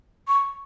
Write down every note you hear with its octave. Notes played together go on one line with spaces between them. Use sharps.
C#6